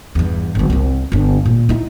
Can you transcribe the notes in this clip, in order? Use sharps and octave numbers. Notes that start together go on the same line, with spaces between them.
E2 G2
G1 F#3
C2 C4
G1 D4
A#2
D#4 E4